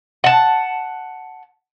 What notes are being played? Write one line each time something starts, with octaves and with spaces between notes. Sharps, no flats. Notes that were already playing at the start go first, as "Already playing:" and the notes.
F#5 A5